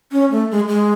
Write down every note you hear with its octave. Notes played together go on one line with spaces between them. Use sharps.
C#4
A3
G#3
G#3